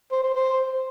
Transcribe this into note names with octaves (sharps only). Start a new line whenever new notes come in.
C5
C5
C5